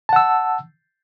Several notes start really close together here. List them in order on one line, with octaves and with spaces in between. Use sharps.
A5 F#5 E6